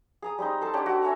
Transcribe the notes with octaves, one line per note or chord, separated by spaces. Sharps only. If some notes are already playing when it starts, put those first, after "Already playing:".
G#4 A#5 D#6
G3 C4 D#4
A4 C5 A5
D4 G4 C#5 F#5
C4 F#4
C#5 E5 G#5 A#5